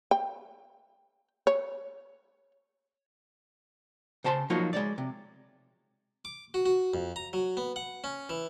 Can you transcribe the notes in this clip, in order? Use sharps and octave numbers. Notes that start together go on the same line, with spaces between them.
G5
C#5
C#3 C5 A5 A#5 C6
F3 F#3 A#3 D#4 F4 C#5
G#3 C#5 D5
C3
D6
F#4
F#4
F2
A#5
F#3
B3
F#5
C#4
E3